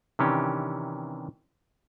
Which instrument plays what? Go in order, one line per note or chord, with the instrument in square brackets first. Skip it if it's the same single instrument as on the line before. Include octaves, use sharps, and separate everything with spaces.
[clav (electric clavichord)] C3 D#3 E3 C#4 D4 G4